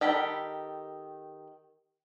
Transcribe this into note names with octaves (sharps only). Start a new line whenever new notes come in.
D#3 G4 A4 G5 B5